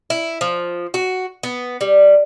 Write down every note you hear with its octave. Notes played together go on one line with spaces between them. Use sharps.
E4
F3
F#4
B3
G3